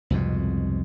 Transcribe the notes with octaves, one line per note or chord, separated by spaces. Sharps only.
C2 F2 G#2 B2